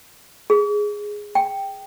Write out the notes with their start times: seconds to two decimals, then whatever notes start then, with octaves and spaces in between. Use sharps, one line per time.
0.50 G#4
1.35 G5